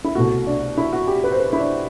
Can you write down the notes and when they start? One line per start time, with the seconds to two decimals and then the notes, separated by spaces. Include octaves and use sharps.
0.04 E4
0.15 C2 B2 A3 F#4
0.47 D4
0.78 E4
0.93 F#4
1.07 G4
1.24 B4
1.32 C5
1.39 B4
1.53 E4
1.59 D4